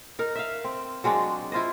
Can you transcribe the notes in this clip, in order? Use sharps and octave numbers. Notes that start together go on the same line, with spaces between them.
D#4 A#4
E5 F5
C4
F#3 G#3 C4 D4
E4 F4 C5 D#5